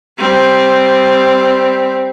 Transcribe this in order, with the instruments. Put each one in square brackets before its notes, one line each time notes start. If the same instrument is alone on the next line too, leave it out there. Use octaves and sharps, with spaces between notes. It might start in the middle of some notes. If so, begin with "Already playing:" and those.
[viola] G3 C4